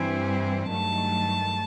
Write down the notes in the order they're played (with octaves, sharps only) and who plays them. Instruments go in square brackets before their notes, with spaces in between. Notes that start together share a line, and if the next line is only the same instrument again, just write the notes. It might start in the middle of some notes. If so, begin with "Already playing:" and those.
Already playing: [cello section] G2 E3 G3 C4 [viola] G#5
[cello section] G2 D#3 F#3 A3 [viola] A5